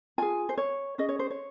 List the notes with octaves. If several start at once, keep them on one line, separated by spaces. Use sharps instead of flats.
F4 G#4 G#5
C5
C#5
C#4 G#4 D#5
C#5
C5
C#5